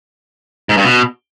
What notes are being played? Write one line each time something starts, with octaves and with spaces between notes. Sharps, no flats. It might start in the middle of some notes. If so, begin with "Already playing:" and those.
G#2
G2
B2